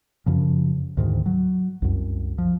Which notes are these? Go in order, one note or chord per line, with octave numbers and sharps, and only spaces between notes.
F#2 C#3 F3
D2 G#2 D#3
F#3
C2 F#2
F3